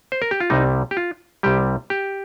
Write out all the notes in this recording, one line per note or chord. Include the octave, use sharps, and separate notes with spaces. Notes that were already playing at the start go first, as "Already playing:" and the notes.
C5
A#4
G4
F4
C2 C3 G3 D#4
G4
F4
C2 C3 G3 G4
G4